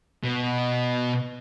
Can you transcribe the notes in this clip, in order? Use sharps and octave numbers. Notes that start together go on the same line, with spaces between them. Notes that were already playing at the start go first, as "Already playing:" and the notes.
B2